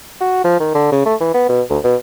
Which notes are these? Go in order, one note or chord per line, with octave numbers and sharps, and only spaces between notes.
F#4
F3
D#3
D3
C#3
A3
E3
B3
B2
D2
B2